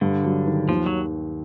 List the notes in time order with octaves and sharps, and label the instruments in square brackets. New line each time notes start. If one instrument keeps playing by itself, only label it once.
[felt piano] G2 [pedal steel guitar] D3
[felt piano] F#3
D#3
[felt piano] D#2 [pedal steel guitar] F3
[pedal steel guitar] F#3